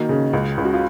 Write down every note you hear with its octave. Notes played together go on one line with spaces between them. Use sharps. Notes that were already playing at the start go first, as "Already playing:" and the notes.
Already playing: D#3 A#3 F#4
C#3
C#2
C#2
F#4
F4